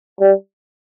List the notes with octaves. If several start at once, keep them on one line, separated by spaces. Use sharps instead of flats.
G3